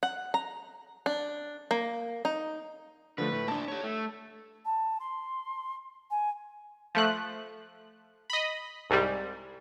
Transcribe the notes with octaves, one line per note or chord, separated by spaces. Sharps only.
F#5
A#5
D4
A#3
D#4
D3 F3 A3 B4
A2 A3
A#3 D4 A5
G4 C#5
A3
A5
C6
G#5
F3 A3 F#6
D#5 B5
C2 G#2 G3